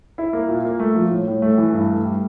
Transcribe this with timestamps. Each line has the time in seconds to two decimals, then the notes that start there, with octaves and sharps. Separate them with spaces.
0.18 E4
0.33 A#3
0.49 A#2
0.65 A#3
0.79 A3
0.95 F3
1.11 A2
1.27 A2
1.42 A3
1.58 E3
1.73 G2
1.88 A3
2.05 G3